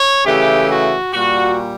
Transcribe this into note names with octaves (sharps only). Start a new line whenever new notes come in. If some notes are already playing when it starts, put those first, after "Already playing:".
Already playing: C#5
C#3 E3 A3 G4
F#4
A#2 G3 F#4